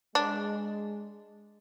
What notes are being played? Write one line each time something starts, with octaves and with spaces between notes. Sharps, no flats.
G#3 D4